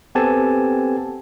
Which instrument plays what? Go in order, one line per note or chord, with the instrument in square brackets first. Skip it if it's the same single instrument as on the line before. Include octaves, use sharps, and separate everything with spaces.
[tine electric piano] B3 C4 G4 A4 G#5 A5